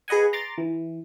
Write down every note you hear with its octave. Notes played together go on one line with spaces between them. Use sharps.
G#4 B4 D#5 F#5 G#5
A#5 C6 D6 A6
E3